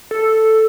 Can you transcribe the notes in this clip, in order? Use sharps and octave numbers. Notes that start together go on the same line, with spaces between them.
A4